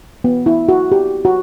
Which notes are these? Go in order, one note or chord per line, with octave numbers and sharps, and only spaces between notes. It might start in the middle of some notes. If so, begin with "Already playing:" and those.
B3
E4
F#4
G4
F#4